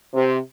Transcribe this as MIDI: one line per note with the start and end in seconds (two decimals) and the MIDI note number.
0.14 0.37 48